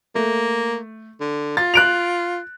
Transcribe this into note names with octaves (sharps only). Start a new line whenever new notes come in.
A3 A#3
D3
F4 A6
F#6 D7 F7